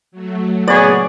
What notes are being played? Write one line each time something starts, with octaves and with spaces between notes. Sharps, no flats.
F#3 A3
A#2 C#3 F#3 B3 G#4 C#5 D5